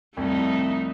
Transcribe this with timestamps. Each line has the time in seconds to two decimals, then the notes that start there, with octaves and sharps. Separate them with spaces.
0.17 C2 F2 A3 D#4